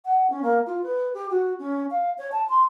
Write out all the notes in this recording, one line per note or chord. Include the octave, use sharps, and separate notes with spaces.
F#5
C#4
A#3
F4
B4
G4
F#4
C#4
F5
C#5
A5
C6